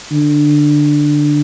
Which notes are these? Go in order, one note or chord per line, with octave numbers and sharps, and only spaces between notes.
D3